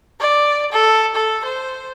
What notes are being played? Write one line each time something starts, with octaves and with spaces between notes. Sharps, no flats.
D5
A4
A4
C5